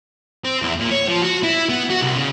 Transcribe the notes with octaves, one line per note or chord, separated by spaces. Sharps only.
C4
E2
A#2
C#5
F3
F#4
E4
B3
F#4
C2
C#3